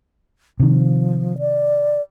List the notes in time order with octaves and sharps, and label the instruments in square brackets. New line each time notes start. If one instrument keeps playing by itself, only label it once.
[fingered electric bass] C3 D#3 [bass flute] F3
[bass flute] D5